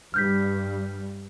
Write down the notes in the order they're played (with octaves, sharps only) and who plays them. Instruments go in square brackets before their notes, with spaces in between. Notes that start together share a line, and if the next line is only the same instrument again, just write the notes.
[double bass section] G2 G3 [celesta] F6 G6 B6